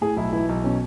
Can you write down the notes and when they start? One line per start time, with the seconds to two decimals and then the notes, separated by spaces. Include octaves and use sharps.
0.01 A2 G#4
0.17 B1 E4
0.33 E3 E4
0.49 B1
0.64 B2 C#4